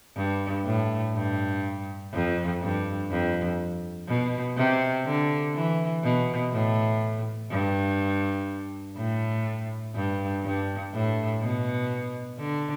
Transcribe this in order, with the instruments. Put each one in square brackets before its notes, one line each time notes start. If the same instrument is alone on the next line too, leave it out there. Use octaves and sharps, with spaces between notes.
[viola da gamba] G2
A2
G2
F2
G2
F2
B2
C3
D3
E3
B2
A2
G2
A2
G2
G2
A2
B2
D3